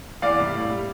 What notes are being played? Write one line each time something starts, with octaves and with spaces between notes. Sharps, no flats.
E2 D5 F5
C3 G3
A2
G3